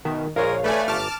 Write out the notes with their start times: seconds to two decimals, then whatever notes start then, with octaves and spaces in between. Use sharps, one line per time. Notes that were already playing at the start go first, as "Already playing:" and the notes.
0.05 B2 D#3 B3 E5
0.36 A#1 G#3 D4 A#4 C#5 F5
0.64 A3 B4 D5 G#5
0.88 G1 F#2 A5 D6 F6